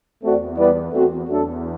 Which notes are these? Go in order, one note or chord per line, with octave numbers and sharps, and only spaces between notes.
E2 A3 C4 F#4 A4 D5
G3 B3 E4 B4 D5
E2 A3 C4 F#4
E2 F#3 A3 D4 A4